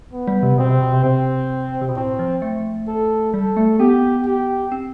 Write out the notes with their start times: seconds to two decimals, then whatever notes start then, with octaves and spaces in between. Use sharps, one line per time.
0.13 B3
0.28 G3
0.43 C3
0.58 B2 C4
0.69 C3
0.81 B2
0.93 C3
1.04 C3 C4
1.81 C3
1.89 B2
1.96 A2 C4
2.19 F3
2.42 A3
2.88 A4
3.33 G3 A4
3.57 A3
3.79 B3 G4
4.26 G4
4.72 C4